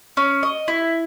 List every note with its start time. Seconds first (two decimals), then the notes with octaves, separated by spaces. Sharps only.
0.17 C#4
0.43 D#5
0.68 E4